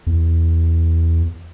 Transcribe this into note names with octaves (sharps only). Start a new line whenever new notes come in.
E2